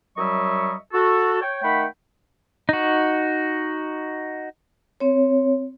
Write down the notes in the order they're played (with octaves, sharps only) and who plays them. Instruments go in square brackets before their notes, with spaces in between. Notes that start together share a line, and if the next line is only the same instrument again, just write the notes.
[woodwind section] F#2 F#3 G3 D#5 E5 C#6
F#4 A4
C#5 G5
D#3 A3 F#5 G5 B5
[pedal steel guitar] D#4 F#4
[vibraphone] C4 C#5